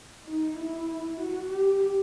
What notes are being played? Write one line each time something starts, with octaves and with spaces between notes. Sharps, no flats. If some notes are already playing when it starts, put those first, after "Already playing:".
D#4
E4
F#4
G4